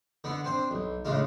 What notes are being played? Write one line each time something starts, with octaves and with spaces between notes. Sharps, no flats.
D3 B3 D4
C4 D4 C5
B1
A2 C#3 G#3 D4 F4